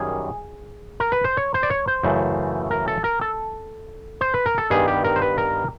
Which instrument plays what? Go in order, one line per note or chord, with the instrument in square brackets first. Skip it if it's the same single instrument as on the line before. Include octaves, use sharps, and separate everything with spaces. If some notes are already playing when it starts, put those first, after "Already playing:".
Already playing: [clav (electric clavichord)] F#2 D#3 G3 G#4
A#4
B4
C5
C#5
C5
D5
C#5
C5
F#2 C#3 E3 A3
A#4
A4
A#4
A4
C5
B4
A#4
A4
G2 D#3 G3 B3 G#4
G4
A#4
C5
B4
A#4